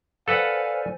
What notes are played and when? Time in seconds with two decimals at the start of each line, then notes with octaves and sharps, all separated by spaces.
0.28 A4 B4 C5 D5 F5 F#5 G#5